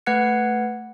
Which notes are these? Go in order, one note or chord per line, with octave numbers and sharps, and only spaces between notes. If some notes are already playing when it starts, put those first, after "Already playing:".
A3 B4 F#5 F#6 G#6 C#7